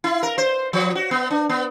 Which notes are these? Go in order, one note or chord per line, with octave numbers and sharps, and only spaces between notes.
E4
A#4
C5
F3
F#4
B3
D4
B3